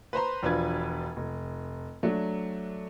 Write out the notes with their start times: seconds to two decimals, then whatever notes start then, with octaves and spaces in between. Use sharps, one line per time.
0.13 B4 C5 A#5 C6
0.43 E1 F3 D4 F4 B4 G#6
1.16 F1
2.03 F#3 A3 D4